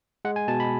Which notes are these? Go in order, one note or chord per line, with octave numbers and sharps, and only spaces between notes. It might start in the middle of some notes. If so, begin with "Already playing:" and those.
G#3 F#5
G#5
B2 A5
B5